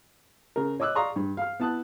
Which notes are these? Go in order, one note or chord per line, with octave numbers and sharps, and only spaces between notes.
C#3 A#4
C#5 D#5 D6 E6 F#6
D5 F5 A#5 C6 C#6 D#6
G2
F5 F6
B3 E4 A5 D#6 F#6